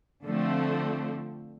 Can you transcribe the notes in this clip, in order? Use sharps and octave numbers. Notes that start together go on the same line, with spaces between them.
D3 F3 A3 C4